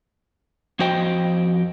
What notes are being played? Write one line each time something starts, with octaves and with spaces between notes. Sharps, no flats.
F2 F3 F#4 C5 D#5 G5